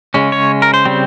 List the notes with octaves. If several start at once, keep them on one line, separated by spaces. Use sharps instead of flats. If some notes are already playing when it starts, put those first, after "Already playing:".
C#3 G#3 C#4
C#5
A#4
C5
C#3 G3 C4